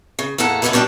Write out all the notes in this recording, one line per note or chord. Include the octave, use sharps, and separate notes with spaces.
C#3
E2 A2 A#3 A4 F#5
G#2 D3 E3 A#3 B3 E4
B2 G3 D4 D5 G5